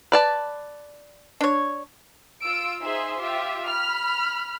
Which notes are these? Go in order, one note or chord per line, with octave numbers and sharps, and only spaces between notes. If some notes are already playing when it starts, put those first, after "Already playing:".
B4 D5 A5
D4 C#5
F4 E6 D7
D#4 G#4 C5 E5 C6
F4 G4 E5
B5 F6